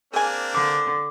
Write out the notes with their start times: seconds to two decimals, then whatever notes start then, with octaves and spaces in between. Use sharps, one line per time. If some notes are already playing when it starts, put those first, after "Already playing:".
0.13 A#3 C4 D4 G#4 G#5
0.55 D3 D6